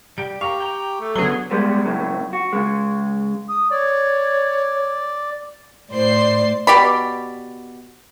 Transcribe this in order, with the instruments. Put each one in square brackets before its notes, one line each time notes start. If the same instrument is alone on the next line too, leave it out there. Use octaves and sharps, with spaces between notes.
[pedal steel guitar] G3 G4 [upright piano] D7
[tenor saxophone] G4 [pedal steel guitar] A#4 F5 [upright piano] C#6
[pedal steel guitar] G5 A#5
[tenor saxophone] A3
[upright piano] D3 B3 G7 [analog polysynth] F#3 G#4
[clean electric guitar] G3 G#3 B3
F#2 A2 C#3
F#4
C#3 G#3
[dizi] D#6
[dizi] C#5 [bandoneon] D5
[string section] A2 C5 D5 C6 C7
[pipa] B2 G4 D5 B5